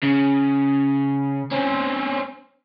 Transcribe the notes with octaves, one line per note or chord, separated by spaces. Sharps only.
C#3
C4 C#4